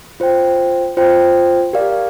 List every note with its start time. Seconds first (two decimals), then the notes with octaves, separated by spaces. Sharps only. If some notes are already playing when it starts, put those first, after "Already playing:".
0.20 F4 C5 G5
0.97 F4 C5 G5
1.73 G4 A#4 D5 F5